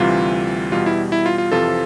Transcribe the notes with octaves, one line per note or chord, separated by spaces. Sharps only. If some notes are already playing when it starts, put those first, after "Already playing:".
Already playing: D2 C3 E3 G3 F4
E2 B2 G3 F4
E4
E4
F4
F4
F2 C3 E3 F4 A4